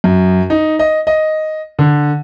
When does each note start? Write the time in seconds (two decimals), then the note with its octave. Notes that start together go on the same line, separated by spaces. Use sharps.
0.04 F#2
0.50 D#4
0.79 D#5
1.07 D#5
1.79 D3